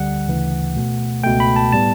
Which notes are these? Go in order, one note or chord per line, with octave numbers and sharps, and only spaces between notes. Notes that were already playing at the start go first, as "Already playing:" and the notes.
Already playing: D2 D3 G3 F#5
D2 C#3 E3
B2 A3
C#2 B2 A3 G5
B5
A5
A2 G3 B3 A5